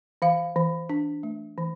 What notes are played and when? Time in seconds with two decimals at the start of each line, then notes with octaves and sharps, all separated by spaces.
0.22 E3 F5
0.56 E3
0.89 D4
1.23 A3
1.58 E3